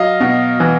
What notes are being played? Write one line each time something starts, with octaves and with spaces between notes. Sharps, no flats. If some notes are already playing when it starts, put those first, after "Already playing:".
Already playing: F#3 D#5 F5
B2
E3